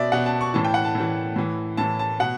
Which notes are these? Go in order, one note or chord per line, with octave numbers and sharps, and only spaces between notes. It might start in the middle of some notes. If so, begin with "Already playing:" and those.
Already playing: B2 D5 E5
B2 F#5
A5
C#6
A2 E3 A5
G5
F#5
A5
A2
E3
A2 E3
A2 E3 A5
A5
B2 F#5